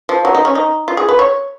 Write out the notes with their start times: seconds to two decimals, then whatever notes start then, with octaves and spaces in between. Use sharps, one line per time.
0.09 F3
0.25 F#3
0.35 D#4
0.45 C#4
0.55 D#4
0.88 F4
0.97 G#4
1.09 B4
1.19 C#5